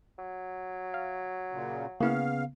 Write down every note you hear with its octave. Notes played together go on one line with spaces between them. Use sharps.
F#3
F5
A#2 C#3
C#3 A#3 B3 E4 F5